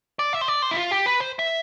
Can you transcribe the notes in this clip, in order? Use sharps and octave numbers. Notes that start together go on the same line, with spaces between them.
D5
E5
C5
D5
C5
E4
F4
G4
B4
C5
E5